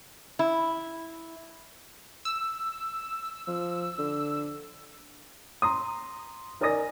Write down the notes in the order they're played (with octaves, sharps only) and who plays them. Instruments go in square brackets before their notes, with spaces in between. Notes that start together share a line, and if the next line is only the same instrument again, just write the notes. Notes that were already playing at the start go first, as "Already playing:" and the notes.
[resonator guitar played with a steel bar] E4
[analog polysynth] E6
[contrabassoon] F3
D3
[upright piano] A#5 C6 D#6
D#4 A#4 D5 G#5 D#6 A#6